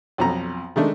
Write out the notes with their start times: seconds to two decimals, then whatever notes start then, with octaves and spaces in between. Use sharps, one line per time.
0.18 B1 F2 A#5
0.76 D#3 G#3 A3 D4